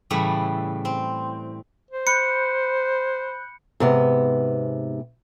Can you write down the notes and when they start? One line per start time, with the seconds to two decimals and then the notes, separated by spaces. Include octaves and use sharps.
0.10 A2 C#3 E3 G3 A3 E4
0.85 C4
1.91 C5
2.07 B5 F#6 G6 C#7
3.80 G#2 C3 B3